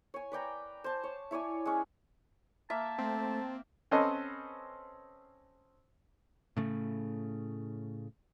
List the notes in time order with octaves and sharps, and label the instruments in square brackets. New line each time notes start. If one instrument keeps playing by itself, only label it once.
[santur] C#5 G#5
B4 D5 G5 A#5
C5 A5
C#5
E4 C#5 D5 G#5
G#3 C#4
[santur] A#3 E5 [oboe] A5
[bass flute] A3 [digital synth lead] C4
[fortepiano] C4 C#4 A4 B4 C5 D#5
[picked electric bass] A2 C#3 A3